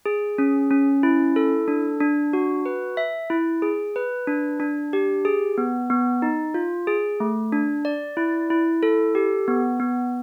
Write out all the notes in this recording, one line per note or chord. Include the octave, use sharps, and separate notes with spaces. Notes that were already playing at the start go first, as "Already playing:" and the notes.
G#4
C#4
C#4
E4
A4
D4
D4
F#4
B4
E5
E4
G#4
B4
D4
D4
G4
G#4
B3
B3
D#4
F4
G#4
A3
D4
D5
E4
E4
A4
G4
B3
B3